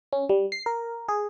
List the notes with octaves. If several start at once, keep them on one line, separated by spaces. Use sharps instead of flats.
C#4
G3
C7
A#4
G#4